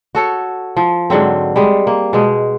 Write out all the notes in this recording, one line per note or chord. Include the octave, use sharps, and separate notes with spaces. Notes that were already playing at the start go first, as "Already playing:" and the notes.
F#4 A4 C#5
F3
G#2 D3 F#3 C4
G3 G#3
A#3
B2 G#3